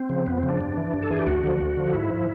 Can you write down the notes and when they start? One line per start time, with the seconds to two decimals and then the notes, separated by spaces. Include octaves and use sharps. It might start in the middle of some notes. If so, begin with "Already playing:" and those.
Already playing: C4
0.09 C#3 F3
0.26 F2 B3
0.38 C4
0.43 C#3 F3
0.49 D4
0.61 G2
0.77 E3
0.94 G2
1.02 A4
1.11 E3 G#4
1.19 G4
1.26 D2 F#4
1.44 D3 F3
1.61 D2
1.77 D3 F3
1.93 G#2 E4
2.10 F3